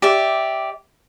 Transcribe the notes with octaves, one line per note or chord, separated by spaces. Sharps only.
G4 D5 E5